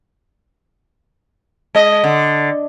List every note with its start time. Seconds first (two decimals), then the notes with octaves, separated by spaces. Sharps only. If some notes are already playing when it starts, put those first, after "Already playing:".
1.75 G#3 D#5
2.04 D3